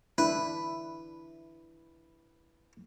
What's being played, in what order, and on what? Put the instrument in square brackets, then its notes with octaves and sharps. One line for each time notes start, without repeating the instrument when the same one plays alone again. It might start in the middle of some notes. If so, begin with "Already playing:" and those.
[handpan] D4 E4 [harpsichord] B4